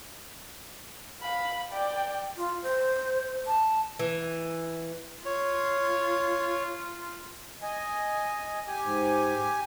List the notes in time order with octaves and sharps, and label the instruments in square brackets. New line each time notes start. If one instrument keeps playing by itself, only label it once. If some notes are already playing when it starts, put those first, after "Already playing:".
[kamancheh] F5 B5
D5 G5
[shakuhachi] F4
C5
A5
[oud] E3
[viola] F4 [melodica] C#5
[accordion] D#5 G#5
G4 G#5
[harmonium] G#2